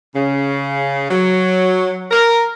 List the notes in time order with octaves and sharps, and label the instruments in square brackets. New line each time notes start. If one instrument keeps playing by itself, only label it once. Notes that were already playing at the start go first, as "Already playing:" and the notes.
[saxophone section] C#3
F#3
A#4